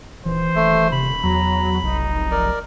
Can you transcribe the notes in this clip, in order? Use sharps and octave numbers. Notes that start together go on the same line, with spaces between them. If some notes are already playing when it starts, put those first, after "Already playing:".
D#1 E3 C5
D#1 A3
C3 B5
E2 F#3 A#5
F1 B1 D#4
A#4 D5